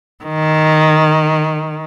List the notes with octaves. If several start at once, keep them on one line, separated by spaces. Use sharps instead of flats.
D#3